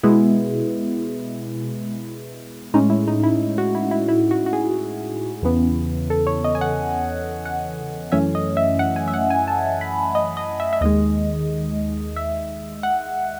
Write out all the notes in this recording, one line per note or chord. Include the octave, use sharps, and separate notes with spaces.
B2 G#3 B3 E4
A2 G#3 C#4 D#4
E4
D#4
E4
F#4
E4
E4
E4
F#4
F#4
G#4
E2 C#3 E3 B3
A4
C#5
D#5
G#5
F#5
F#5
F#2 E3 A3 C#4 E5
D#5
E5
F#5
G#5
E5
F#5
G#5
A5
B5
D#5
D#5
E5
E5
D#2 D#3 G#3 D#5
E5
F#5